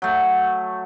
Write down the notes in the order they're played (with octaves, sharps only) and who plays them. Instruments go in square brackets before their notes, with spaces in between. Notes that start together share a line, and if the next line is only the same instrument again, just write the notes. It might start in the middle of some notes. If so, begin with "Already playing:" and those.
[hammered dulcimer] F#3 A3